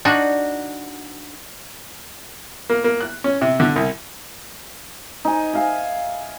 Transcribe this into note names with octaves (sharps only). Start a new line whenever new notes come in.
D4 D#4 F#4
A#3
A#3
F#6
C#4
C3
D3
C2
D#4 G#5
E5 F5 G#5